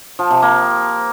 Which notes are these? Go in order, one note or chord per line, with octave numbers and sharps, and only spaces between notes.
F3
C3
A#3